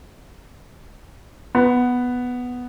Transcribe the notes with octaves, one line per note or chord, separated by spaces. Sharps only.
B3